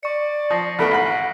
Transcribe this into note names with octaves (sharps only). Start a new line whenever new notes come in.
D5 C#6 C#7
F3 D#6 A#6 C7
E2 A3 B3 B5 F6 B6 D7
G#1 F#5 B5